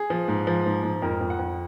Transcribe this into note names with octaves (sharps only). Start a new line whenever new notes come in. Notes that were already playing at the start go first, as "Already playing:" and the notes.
Already playing: G#4
F3
G#2
F3
G#2
G#2
F2 A#4
F2
F#5
F2